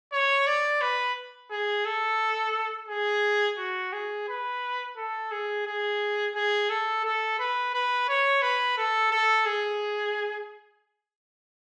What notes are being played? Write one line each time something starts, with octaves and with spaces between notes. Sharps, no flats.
C#5
D5
B4
G#4
A4
G#4
F#4
G#4
B4
A4
G#4
G#4
G#4
A4
A4
B4
B4
C#5
B4
A4
A4
G#4